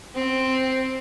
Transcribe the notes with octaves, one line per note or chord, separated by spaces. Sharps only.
C4